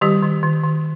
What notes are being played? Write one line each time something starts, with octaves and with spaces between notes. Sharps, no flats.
D#3 G3 G4
D#3
D#3
D#3